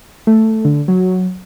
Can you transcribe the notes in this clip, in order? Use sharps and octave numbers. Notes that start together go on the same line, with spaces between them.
A3
D3
F#3